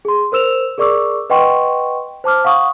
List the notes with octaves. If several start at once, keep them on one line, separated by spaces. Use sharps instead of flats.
G#4 C6
A#4 C5 E6 E7 F7
G#4 A#4 D5 C#6 D6 E6
B4 D#5 F#5 G5 C6 C#6
C5 A5 D6 F6
F5 F#5 C#6 D#6